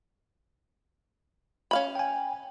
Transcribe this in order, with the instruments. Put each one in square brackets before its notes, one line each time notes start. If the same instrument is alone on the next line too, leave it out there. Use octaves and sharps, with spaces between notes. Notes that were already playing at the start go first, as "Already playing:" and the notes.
[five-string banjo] C#4 F5 B5
[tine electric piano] G5 G#5